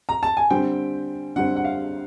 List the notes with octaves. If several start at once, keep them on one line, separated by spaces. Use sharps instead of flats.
A#5
A5
G#5
D3 G3 C4 G5
D3 G3 C4 F#5
F#5
F5